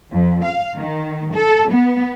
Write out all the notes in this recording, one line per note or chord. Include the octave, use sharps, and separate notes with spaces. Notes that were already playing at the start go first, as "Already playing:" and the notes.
F2
F5
D#3
A4
B3